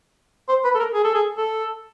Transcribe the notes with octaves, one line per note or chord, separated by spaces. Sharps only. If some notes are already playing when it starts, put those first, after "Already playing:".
C5
B4
A4
A#4
G#4
A4
G#4
A4